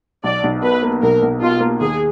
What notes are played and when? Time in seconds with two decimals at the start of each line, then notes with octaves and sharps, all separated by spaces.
0.24 B1 D5
0.44 B1
0.62 B2 B4
0.83 A#3
1.02 B1 A#4
1.22 B1
1.41 B2 F4
1.60 A#3
1.81 D#2 G#4